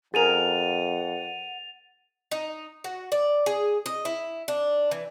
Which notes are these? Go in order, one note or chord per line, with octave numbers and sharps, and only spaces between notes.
F2 G#4 A#4 F#5 A6 D#7 F7
D#4
F#4
D5
G#4
D#5
E4
D4
E3